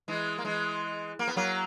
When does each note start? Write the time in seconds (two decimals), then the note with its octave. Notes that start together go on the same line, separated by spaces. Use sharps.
0.08 E3 G#3
0.38 A#3
0.45 E3 G#3
1.19 A#3
1.28 B3
1.36 F#3 A#3